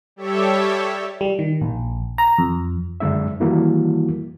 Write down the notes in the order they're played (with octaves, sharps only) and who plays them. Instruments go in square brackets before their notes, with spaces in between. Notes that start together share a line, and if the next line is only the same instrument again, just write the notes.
[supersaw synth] G3 G4 A4 C#5 E5
[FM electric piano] G3
D#3
A#1
A#5
F2
[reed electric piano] F#2 D3 G#3 D4 E5
D#3 E3 G3 A#3 E4 F#4